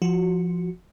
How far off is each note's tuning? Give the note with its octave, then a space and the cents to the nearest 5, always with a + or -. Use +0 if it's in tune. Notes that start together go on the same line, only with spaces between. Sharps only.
F3 -5 F#4 +0